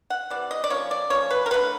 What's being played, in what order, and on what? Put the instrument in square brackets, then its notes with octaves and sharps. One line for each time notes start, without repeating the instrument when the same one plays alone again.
[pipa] F#5
C3 E3 D5
D#5
D5
F3 A#3 C#4 C#5
D5
F3 A#3 C#4 C#5
B4
A#4
D3 F#3 A3 B4